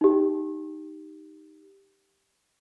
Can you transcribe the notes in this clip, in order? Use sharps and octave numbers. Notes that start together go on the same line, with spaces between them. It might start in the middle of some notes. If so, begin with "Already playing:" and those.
D#4 G4